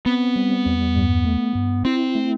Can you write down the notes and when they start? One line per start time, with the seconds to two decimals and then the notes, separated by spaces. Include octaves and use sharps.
0.06 B3 C4
0.36 G3
0.66 E2
0.96 G2
1.25 A3
1.55 G2
1.85 C4 E4
2.15 A3